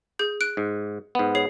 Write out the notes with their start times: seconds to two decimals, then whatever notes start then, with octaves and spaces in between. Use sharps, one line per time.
0.19 G#4 G6
0.41 F#6 D7
0.57 G#2
1.15 G#2 B3
1.35 G#4 C#5 C7